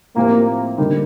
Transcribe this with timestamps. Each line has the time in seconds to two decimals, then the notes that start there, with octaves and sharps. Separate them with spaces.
0.16 A2 F3 A#3 C4 G4 C5
0.78 D3 G3 A#3 D#4